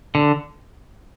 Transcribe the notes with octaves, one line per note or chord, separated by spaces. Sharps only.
D3